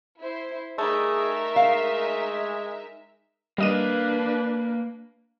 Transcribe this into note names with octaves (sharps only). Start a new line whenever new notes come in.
E4 C5
G3 A3 D#4 G#4 A#4 E5
G#3 F5
G3 A#3 D4 B4 D#5 D#7